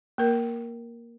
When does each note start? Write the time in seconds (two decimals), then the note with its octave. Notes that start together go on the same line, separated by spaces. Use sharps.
0.18 A#3 A#4